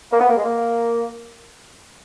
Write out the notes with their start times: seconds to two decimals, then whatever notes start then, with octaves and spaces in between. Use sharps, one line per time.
0.12 A#3
0.20 B3
0.29 A#3
0.37 G#3
0.44 A#3